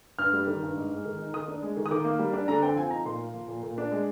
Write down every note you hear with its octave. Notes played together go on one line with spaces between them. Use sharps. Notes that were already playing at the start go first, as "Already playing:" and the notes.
G2 F6
G3
D#3
G2
G#2
G#3
D#3
D#4
D#3 D#6
D4
G#3
D#3
D#6
D#3 D6
A#3
G3
D4
D3 A#5
C4 G5
F3 G#5
D#4 A#5
A#2 C6
A#3
F3
A#2
A#2
D4
G#3